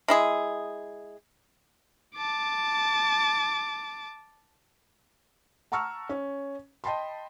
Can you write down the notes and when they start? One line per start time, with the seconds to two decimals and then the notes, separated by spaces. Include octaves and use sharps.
0.08 G#3 E4 G#4
2.16 A5 D6
5.72 F#5 A5 A#5 C#6 E6 F6
6.09 C#4
6.84 D#5 G5 A5 B5 C6